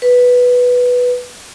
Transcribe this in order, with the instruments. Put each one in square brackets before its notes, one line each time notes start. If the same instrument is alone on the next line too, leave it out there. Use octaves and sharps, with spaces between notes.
[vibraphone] B4